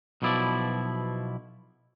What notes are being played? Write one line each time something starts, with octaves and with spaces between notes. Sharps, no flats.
B1 B2 F3 E4 D5